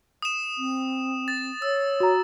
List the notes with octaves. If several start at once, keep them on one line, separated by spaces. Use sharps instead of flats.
D#6 E7
C4
A6
C#5 E6
F#4 A#5